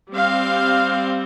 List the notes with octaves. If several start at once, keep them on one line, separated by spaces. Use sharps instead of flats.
G3 C4 F5